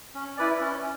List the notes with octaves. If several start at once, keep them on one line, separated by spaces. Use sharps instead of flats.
C#4
E4 B4 D5
C#4